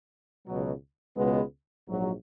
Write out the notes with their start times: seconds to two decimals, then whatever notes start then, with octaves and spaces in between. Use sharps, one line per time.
0.47 C#2 B2 F#3
1.16 C#2 B2 G#3 B3
1.87 A#1 G#2 F#3